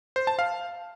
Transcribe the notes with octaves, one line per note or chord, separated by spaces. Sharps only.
C5
A5
F5